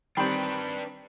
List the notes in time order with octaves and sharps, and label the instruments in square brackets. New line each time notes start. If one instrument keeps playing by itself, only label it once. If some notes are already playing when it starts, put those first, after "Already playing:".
[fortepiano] D#3 G3 C4 [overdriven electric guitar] D4 B4 [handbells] G5 B5